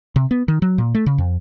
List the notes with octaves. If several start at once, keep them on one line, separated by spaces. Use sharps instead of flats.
C3
B3
D#3
F#3
A#2
A3
C#3
F2